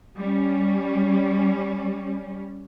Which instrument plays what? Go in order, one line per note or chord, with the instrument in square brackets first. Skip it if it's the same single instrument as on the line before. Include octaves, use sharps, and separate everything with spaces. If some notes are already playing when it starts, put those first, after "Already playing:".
[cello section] G3 C#4